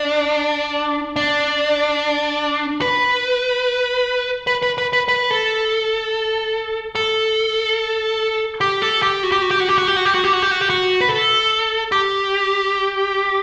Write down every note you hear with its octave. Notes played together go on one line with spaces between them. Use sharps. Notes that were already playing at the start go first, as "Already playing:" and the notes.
Already playing: D4
D4
B4
B4
B4
B4
B4
B4
A4
A4
G4
A4
G4
F#4
G4
F#4
G4
F#4
G4
F#4
G4
F#4
G4
F#4
G4
F#4
G4
F#4
G4
F#4
B4
A4
G4